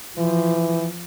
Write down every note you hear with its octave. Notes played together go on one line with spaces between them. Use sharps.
E3 F3